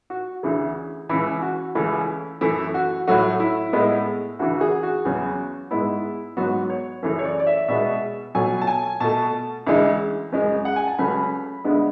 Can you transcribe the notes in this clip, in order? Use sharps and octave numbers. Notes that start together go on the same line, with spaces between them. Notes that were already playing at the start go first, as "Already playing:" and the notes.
F#4
D2 C#3 E3 G#4
C#2 C#3 E3 E4
F#4
C#2 C#3 E3 A3 E4
F#2 E3 A3 E4
F#4
A2 F#3 A3 F#4
E4
A2 G#3 B3
D2 C#3 E3 F#4
F#4
G#4
F#4
E2 C#3 F#3
G#2 G#3 B3 E4
G#2 F#3 B3 F#4
C#5
F#2 C#3 E3 A3
C#5
D5
D5
E5
B2 G#3 B3 E5
B2 F#3 A3 G#5
A5
G#5
B2 A3 A5
D2 C#3 E3 G#3
F#2 C#3 G#3
F#5
G#5
A5
C#2 C#3 F#3 A3 B5
D2 D3 G#3 B3